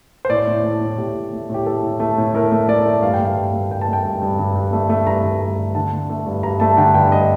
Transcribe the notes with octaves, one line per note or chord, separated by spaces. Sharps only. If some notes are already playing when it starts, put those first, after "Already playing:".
C5
A2 D5
A2
A3
A2
A2 G4
A2
A3
A2 G4
A3 A4
A2
A3
A2
A3 A#4
A3
A3 D5
A3
G2 F5
G5
A3
F5
G2
A3
G2 G5
A5
A3 G5
G2
G2
G2
G2
A3
A3
G2 A#5
G2
A3
G2
D3 A5
A3
A3
G2
G2 A#5
A3 A5
D3 G5
G2 G5
D#5